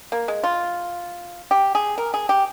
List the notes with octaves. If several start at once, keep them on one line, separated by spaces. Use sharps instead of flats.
A#3
G#3
F4
G4
G#4
A#4
G#4
G4